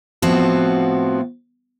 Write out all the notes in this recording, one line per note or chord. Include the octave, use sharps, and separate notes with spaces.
A2 F3 B3 C4 F#4